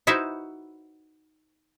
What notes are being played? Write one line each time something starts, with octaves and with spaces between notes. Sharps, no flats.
D#4 E4 F#4 B4 C5 E5